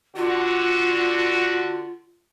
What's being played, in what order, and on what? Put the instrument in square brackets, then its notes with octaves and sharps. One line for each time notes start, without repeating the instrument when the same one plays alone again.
[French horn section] D3 F#4 [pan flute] F4